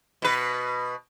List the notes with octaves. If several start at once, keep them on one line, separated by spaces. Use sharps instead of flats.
B2 B4